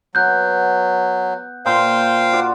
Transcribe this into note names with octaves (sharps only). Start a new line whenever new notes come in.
F#3 B3 F#6 G6
A#2 C5 F5 G5 C6
F4 F#4 D5